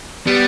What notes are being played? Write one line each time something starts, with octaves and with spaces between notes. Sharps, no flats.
G3 B3